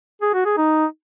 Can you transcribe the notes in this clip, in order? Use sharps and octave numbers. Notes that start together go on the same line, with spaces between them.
G#4
F#4
G#4
D#4